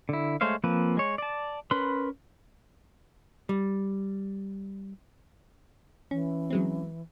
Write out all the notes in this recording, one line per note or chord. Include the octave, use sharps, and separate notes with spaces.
D3 E4
G#3 A3 C5 C#5 F5
F3 A#3 C4 B4
G#3 C#5
D5 A5
C#4 A#4 B4 B5 C6
G3
E3 C#4
F#3 G#3 C4